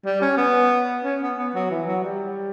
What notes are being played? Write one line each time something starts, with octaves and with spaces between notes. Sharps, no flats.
G3
C#4
B3
C#4
B3
B3
F#3
E3
F#3
G3